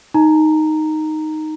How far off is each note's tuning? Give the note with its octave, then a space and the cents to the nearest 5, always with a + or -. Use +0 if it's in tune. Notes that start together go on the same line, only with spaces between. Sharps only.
D#4 +0 A#5 -10